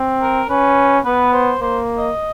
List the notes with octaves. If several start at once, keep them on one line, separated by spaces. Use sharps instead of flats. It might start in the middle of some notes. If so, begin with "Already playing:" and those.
Already playing: C4
A#4
C#4 B4
B3 B4
C5
A#3 C5
D#5